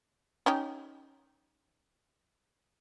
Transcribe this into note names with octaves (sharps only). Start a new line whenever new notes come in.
C#4 D#4 G4